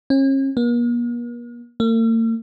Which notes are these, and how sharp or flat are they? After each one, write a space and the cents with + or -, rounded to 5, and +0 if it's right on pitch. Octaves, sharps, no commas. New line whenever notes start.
C#4 -40
A#3 +45
A#3 -45